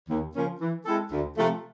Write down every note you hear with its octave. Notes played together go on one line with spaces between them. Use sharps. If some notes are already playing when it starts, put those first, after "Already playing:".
D#2
C#3 F3 A#3 C#4
E3
G#3 C4 E4 A4
D2
C3 F3 A3